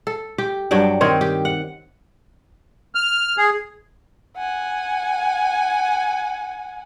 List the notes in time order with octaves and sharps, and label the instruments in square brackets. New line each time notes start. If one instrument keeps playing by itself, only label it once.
[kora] A4
G4
G2 F#3 D4 G5
D#3 C4 C#5
G4
F#5
[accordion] F6
G#4
[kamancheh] F#5 G#5